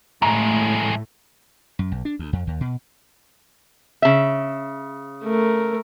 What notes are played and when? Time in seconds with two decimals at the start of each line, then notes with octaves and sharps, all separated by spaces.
0.22 A2 G#3 A3 A#5
1.79 F#2
1.92 B1
2.05 D4
2.19 D2
2.33 F2
2.47 D#2
2.61 B2
4.02 C#3 E5
5.24 A3 A#4